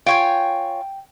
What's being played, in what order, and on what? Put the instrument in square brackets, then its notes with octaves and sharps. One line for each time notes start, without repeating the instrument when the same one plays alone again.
[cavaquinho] F4 C#5 G#5 [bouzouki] G5